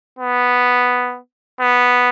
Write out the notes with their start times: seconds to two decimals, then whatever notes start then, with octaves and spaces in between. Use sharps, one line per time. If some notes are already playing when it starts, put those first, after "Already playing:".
0.19 B3
1.60 B3